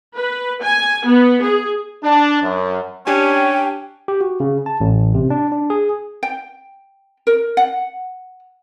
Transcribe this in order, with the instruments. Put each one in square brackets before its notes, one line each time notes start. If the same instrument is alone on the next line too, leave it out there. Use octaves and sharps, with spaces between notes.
[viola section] B4
G#5
B3
G#4
[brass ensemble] D4
F#2
[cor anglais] C#4 [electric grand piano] D4 G4 G#5 [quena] G5
[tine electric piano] G4
F#4
C#3
A5
A1
C3
D4
D4
G#4
[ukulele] G5
A#4
F#5